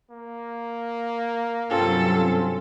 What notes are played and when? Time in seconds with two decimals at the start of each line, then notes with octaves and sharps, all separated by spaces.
0.11 A#3
1.70 G2 C3 F#3 C4 C#4 F4 A4